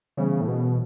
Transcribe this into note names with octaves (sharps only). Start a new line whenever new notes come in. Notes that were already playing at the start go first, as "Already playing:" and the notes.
C#3 E3 G3 B3
A2
B2